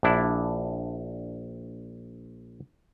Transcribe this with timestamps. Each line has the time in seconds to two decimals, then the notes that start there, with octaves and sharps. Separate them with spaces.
0.03 A#1 D4 E4